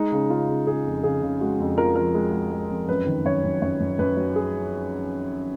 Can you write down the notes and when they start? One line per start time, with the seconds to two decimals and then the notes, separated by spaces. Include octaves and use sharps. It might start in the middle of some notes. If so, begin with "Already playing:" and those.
Already playing: G#3 D#4
0.12 C#3
0.30 C#3 F4
0.49 C#3
0.67 C#3 G#4
0.86 F2
1.03 C#3 G#4
1.22 C#3
1.41 G#3 F#4
1.59 F2
1.77 F3 A#4
1.96 F3 A#4
2.14 G#3
2.33 G#3
2.51 G#3
2.70 F2
2.88 F#2 B4
3.07 D#3
3.25 F#2 C#5
3.44 F#2
3.62 F#2 C#5
3.80 F#2
3.99 F#2 B4
4.17 F#3
4.36 G#4